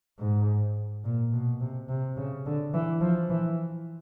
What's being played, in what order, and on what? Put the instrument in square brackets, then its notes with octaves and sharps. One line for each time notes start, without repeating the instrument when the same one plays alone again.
[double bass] G#2
A#2
B2
C3
C3
C#3
D3
E3
F3
E3